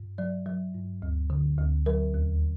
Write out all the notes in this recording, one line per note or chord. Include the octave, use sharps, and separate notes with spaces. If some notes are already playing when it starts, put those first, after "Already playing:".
Already playing: G2
F#3 D5
F#3
G2
D2
D3
D2
F#3 A#4
D#2